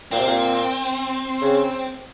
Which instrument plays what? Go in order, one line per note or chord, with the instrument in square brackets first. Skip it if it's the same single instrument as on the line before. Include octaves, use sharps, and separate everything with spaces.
[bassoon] A#2 [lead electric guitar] C4
[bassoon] C3
A#2
C#3